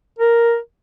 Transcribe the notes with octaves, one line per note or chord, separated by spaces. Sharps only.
A#4